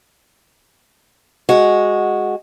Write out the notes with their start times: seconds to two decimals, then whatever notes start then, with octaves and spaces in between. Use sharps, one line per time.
1.49 G#3 F#4